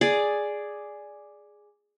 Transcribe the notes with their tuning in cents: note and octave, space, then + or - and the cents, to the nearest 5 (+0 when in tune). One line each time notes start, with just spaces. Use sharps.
G#4 +0 D5 +0